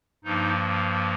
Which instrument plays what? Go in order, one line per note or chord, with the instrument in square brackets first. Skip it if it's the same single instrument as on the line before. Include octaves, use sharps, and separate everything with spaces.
[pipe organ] G2 F3 A#3 D#4